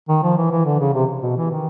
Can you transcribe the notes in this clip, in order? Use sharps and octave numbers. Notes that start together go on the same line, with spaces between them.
D#3
F3
E3
E3
D3
C#3
C3
B2
E3
D#3